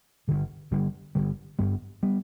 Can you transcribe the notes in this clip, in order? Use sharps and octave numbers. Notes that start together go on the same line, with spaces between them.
G1 G2 D3 G3
G1 G2 D3 G3
G1 G2 D3 G3
G1 G2 G3 B3
G3 B3